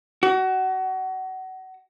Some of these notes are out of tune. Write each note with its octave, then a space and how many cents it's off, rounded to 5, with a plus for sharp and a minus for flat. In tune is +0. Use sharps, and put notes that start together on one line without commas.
F#4 +25